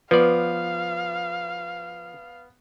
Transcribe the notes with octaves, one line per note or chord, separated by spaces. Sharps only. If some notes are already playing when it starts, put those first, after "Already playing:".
F3 B3 B4 D5 F5